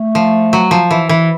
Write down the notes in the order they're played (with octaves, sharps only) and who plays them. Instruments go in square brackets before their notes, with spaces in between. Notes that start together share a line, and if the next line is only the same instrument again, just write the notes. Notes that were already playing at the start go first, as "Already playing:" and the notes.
Already playing: [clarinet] A3
[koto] F3
F#3
F3
E3
E3